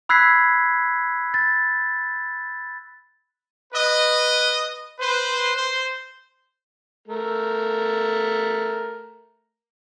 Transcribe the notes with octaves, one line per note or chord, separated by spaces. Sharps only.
B5 E6 F#6 G#6 B6 C7
A6
B4 D#5
B4 C5
C5
A3 A#4